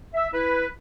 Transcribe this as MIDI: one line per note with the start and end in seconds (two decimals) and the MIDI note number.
0.14 0.28 76
0.33 0.65 64
0.33 0.65 71